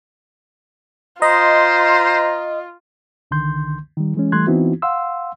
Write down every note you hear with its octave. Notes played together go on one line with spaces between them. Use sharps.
F4 C5 D#5 A#5
C2 D3 D#3 C6 G6
D#3 G3
E3 G#3 C#4
E3 G3 A3 C6 F#6 G#6
E3 B3 C4 D#4 E4 F#4
F5 F#5 C6 E6